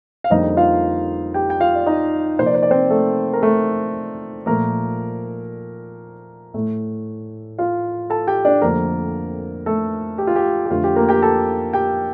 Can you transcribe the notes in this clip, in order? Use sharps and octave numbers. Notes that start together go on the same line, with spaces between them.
F5
F2 D3 G3 A#3 D#4 D#5
F4 F5
G4 G5
G5
F4 F5
D5
D#4 D#5
C3 F3 A#3 C5
D5
C5
D5
C4 C5
A3 A4
A#4
A3 A4
A#2 F3 A3 A#3 A#4
A2 A3
F4 F5
A4 A5
G4 G5
D4 D5
F2 D3 F3 A3 A#3 A#4
A3 A4
G4
F4
G4
G4
F2 D3 A3 F4
G4
A#3 A#4
G4 G5
A4 A5
G4 G5